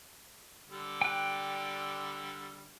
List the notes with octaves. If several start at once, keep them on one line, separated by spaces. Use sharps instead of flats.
D3 G3
G5 F#6